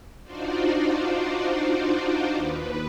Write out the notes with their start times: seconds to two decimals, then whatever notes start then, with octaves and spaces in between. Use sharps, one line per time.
0.24 D4 D#4 F4 F#4 C5 D5
2.34 D#2 B4